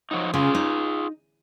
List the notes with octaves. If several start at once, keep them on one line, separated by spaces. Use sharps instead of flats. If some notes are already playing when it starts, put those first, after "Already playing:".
F3 F#3 D#4
C#3 F4 G#4
D#4